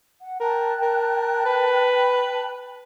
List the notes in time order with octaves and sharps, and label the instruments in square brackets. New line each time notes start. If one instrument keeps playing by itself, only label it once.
[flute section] F#5
[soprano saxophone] A#4 [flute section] G5 A5 F#6
[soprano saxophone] A#4
B4